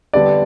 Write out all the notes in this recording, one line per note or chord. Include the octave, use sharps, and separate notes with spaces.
D3 G3 B3 D4 D5